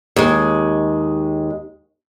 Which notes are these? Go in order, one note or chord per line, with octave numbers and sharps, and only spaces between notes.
D#2 G#3